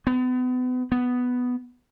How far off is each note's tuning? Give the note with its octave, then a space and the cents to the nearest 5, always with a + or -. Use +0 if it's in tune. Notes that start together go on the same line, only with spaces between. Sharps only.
B3 +35
B3 +5